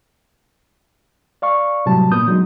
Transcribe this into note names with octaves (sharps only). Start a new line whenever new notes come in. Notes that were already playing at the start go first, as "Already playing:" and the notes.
D5 F5 C#6
A2 C3 F#3 G3 A5
A#2 B3 D#6 G6
E3 F#3 G#3 D#4